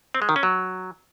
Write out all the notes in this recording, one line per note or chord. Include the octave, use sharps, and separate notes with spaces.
C4
G#3
D#3
C#4
F#3